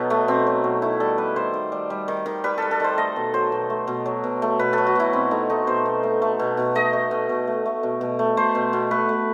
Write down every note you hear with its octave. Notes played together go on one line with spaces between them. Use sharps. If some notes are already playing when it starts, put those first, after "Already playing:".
Already playing: B2 F#3 B3 D#4 A4 B4
A3
B2 C4
F#3
B2
D#3 E4
G3 A4
G3 B4
D#3 C5
D#3
G3
G3
D#3
D#3
G3 B4
G3 A4
A4
D#3 C5
A3 D#5
B2
F#3 C5
B2
A3
B2
F#3
B2
A3
B2 B4
F#3 A4
F#4
B2 E4
B2 C4
A3 D#4
A3 D#4
B2 C5
B2
A3
A3
B2
B2
A3 D#5
A3
B2
B2
A3
A3
B2
B2
A3
A3 C5
B2
B2
A3 B4
A3